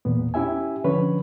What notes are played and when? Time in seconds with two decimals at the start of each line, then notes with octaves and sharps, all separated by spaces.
0.05 E2 A#2 B3
0.34 C#4 E4 G4 E5 G#5
0.84 D3 F3 C#4 B4 C#5